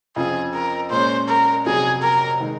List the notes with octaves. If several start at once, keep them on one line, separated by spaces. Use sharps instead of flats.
F2 C#3 F3 G#4
A#4
A#2 G#3 C#4 C5
A#4
F2 C3 F#3 G#4
A#4
D#3 G#3 D#4